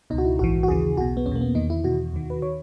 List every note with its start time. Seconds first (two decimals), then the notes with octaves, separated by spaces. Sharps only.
0.10 C#2 B2 D#4
0.18 F#4
0.25 E4
0.39 A#1 G#2 E3 F#4
0.63 F#4
0.68 D#2 C#3 E3 G#4
0.97 B1 B2 F#4
1.17 B3
1.26 E2 C#4
1.31 B2 A#3
1.41 B3
1.55 E2 D#3 D#4
1.70 E4
1.84 E2 B2 F#4
2.13 D#2 D#3
2.30 B4
2.42 D#3 C#5